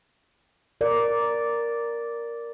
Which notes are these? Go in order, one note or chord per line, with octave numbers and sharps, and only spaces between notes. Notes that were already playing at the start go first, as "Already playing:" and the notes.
A#4 D5